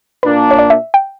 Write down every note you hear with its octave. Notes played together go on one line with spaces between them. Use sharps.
A#2 A#3 D4 B4
C#5
D5
E5
G5